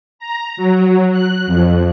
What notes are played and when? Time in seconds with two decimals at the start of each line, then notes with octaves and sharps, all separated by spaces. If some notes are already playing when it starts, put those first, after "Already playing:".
0.19 A#5
0.57 F#3
1.12 F#6
1.47 F2